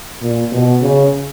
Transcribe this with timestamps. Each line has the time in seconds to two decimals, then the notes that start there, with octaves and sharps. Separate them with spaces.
0.22 A#2
0.52 B2
0.82 C#3